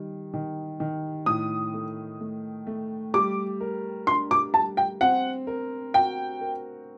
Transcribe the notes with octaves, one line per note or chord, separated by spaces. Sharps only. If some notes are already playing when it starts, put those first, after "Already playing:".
Already playing: D#3 G3
D#3
D#3
A2 D#6
A3
A3
A3
G3 D6
A#4
D4 C6
D6
G3 A5
G5
C4 F#5
A#4
F#4 G5
A#4